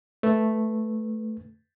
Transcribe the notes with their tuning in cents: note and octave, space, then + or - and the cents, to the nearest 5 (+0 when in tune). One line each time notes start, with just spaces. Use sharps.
A3 -5 B4 +0